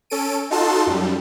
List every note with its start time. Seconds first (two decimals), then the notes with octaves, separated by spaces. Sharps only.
0.10 C#4 A4 D7 D#7
0.50 D#4 F4 F#4 A4 A5 C6
0.87 F#2 G3